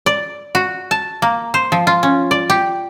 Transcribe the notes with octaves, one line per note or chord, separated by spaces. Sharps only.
D5
F#4
A5
A#3
C5
F3
F4
C#4
D5
G4